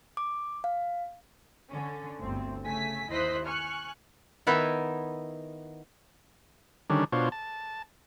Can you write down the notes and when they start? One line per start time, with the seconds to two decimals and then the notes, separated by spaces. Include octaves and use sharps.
0.17 D6
0.64 F5
1.69 D3 C#4
2.20 G1 D2 C4
2.64 C#3 A3 G#5 B6
3.09 D#2 E4 C5 D#5 F#6 B6
3.45 G#5 C#6 F6 F#6
4.47 D#3 B3 D#4 E4 E5
6.90 D3 D#3 G3 C#4 D4
7.12 B2 D4 F4 C5 C#5
7.32 A5